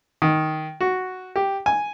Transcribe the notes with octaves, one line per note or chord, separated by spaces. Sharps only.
D#3
F#4
G4
G#5